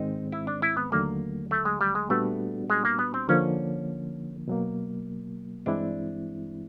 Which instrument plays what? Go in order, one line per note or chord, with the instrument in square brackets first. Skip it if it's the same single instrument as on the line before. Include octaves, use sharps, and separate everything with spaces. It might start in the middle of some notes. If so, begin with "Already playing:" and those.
Already playing: [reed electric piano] G#2 D#3 G#3 C4 [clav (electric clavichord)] D#4
[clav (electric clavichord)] E4
D4
E4
B3
[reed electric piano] D#2 D3 F#3 A3 [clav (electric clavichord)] A#3
[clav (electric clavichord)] A3
G#3
G3
G#3
[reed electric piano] A#2 G3 B3 D4 F#4 [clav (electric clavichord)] A3
[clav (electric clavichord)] G#3
A#3
B3
C4
[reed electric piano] D3 F3 A#3 [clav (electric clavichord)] C#4
[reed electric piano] B2 F#3 A#3
[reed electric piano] G2 E3 G#3 C4 E4 [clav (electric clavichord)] D4